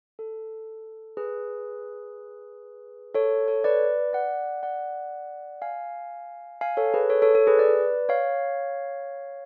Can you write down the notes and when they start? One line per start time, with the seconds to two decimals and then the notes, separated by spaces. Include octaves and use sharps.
0.19 A4
1.17 G#4 B4
3.14 A4 C#5
3.48 A4 C#5
3.64 B4 D5
4.13 D5 F#5
4.63 D5 F#5
5.62 F5 G#5
6.61 F5 G#5
6.77 A4 C#5
6.94 G#4 B4
7.10 A4 C#5
7.22 A4 C#5
7.35 A4
7.47 G#4 B4
7.59 B4 D5
8.09 C#5 F5